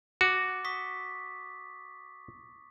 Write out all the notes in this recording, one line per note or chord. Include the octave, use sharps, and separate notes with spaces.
F#4 D6 A6
C#6 D#6 B6